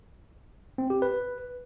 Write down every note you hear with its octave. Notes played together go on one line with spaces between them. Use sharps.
C4
G4
B4